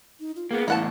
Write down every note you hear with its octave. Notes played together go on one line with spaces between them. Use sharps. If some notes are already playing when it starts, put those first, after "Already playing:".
D#4
F4
A#3 B3 G#4
E2 A2 A#3 E4 F#5 A5